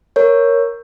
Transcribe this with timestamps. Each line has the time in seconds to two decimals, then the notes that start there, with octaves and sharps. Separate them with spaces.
0.16 A#4 C#5